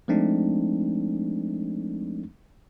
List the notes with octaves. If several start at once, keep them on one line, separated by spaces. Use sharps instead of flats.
F3 G#3 A3 C4 D4 D#4